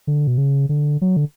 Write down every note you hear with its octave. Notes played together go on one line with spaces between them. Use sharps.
D3
B2
C#3
D3
F#3
D3